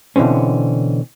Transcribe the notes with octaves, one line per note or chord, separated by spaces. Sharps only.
B2 D3 E3 C4 C#4